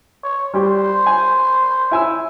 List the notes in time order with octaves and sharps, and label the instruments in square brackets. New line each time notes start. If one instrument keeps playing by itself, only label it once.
[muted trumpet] C#5
[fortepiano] G3 G4 [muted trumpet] C5
[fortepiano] G#5
E4 G#5 E6